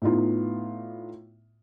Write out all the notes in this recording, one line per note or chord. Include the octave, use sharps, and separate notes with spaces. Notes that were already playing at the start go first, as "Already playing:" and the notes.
A2 B3 D#4 F4